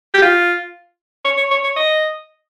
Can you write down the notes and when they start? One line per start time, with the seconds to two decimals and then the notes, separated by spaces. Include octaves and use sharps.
0.14 G4
0.22 F4
1.25 C#5
1.37 C#5
1.51 C#5
1.64 C#5
1.76 D#5